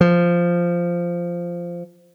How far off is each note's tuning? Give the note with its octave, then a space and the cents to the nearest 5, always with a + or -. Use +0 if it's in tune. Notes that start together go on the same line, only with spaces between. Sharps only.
F3 -5